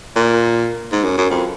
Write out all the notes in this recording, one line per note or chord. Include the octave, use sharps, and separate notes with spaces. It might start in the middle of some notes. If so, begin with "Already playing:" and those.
A#2
G#2
F#2
F#2
F2